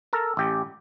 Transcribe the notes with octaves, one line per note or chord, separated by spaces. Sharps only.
A4 A#4
A1 G4